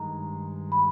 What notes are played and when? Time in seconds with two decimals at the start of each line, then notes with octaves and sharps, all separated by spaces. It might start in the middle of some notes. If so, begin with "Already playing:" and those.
Already playing: G2 D#3 G#3 A#5
0.72 B5